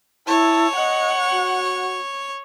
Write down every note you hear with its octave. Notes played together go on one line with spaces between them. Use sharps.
E4 C#5 A5
D#5 F#5
F#4